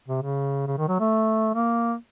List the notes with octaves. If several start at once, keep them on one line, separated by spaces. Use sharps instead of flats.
C3
C#3
C#3
D#3
F#3
A3
A#3